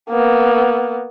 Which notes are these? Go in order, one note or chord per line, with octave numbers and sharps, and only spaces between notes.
A#3 B3